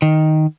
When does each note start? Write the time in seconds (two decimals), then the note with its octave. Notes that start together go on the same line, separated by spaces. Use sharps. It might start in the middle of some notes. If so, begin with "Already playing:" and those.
0.02 D#3